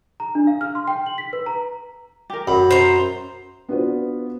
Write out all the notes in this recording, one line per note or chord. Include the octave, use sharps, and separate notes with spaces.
A#5
D4
F5
F6
C6
G5
F#7
B6
B4
A#5
G4 A#4
F#2 B5
C5 A#5
B3 D4 F4 F#4 B4 C5